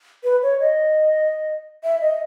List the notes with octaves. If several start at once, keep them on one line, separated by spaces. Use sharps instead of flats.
B4
C#5
D#5
E5
D#5